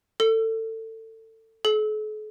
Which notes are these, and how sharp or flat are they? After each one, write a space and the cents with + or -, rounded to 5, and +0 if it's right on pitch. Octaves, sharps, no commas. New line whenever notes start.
A4 +25
A4 -45